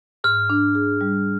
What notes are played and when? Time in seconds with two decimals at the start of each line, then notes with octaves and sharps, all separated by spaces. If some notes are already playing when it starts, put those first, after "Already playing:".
0.24 G#2 F6
0.50 D4
0.75 G#4
1.01 G3